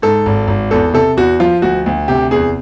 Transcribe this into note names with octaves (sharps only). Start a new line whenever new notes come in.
G#2 A4
G#1
G#1
E2 A4
C3 A4
E2 F#4
F3 F4
D2 F#4
D2
C3 G4
E2 G#4